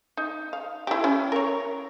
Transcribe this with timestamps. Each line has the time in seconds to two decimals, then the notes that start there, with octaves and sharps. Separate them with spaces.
0.17 D#4
0.53 F5
0.87 E4 G4
1.04 C#4
1.32 A#4 C#5